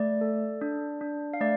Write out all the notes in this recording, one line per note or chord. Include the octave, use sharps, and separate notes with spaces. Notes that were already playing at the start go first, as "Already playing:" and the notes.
Already playing: A3 D5
A4
D4
D4
F5
A3 D5